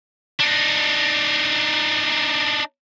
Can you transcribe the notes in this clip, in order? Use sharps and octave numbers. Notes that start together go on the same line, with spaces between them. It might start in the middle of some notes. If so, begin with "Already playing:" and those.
D4 D#4